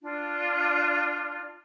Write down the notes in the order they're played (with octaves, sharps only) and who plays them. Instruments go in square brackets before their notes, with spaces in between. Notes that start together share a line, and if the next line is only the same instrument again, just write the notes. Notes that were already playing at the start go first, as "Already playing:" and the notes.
[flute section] D4 F4